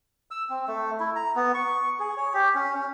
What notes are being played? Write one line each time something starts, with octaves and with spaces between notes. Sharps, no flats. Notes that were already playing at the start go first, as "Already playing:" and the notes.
E6
C4
A3
E4
A#5
B3
C#6
G#4
C#5
G4
C#4
C#4